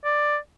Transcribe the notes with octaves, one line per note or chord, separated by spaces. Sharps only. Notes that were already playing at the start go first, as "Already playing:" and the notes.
D5